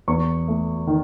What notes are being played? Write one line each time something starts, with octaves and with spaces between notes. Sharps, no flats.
E2 C#6
A3
D#3